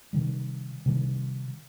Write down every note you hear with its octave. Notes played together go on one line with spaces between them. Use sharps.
C3 D#3 G3
C3 D#3 G3